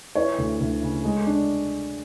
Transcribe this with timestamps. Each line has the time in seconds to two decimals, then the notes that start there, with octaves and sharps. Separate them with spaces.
0.15 E3 C#5
0.38 D2
0.60 D2
0.82 C#3
1.04 G#3
1.27 D4